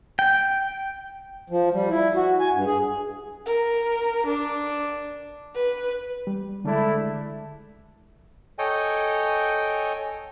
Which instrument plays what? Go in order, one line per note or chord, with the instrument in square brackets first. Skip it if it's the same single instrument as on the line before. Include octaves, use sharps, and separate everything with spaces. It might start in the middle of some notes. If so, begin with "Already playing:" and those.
[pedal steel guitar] G5
[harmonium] F3
G3
E4
F#4
G#5
G2
G#4
[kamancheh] A#4
D4
B4
[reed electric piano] G3
[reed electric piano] D3 G#3 [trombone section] A3 D4 E4
[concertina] A4 C#5 D#5 G5 G#5